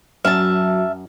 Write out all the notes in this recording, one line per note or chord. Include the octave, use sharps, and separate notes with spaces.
F#2 F#3 E5 A5 F6